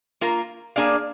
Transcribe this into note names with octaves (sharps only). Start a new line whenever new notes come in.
A#3 F4 A#4
A#3 D4 G#4 D5 F5